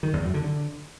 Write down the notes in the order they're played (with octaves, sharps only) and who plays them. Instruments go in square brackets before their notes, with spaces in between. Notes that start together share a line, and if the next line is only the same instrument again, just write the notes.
[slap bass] D#3
E2
F#2
D3
D3